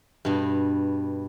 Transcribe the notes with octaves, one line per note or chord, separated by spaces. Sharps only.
G2 B2